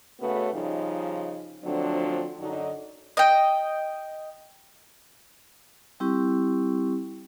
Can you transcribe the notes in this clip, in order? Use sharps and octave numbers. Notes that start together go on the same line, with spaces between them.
C#3 A3 B3 C#4 F#4 B4
C#3 F3 G3 D#4
D3 F3 F#3 A3 C4 D4
F#2 D3 F#3 D4 D#4
D#5 G5
G3 C4 E4 G4 C#6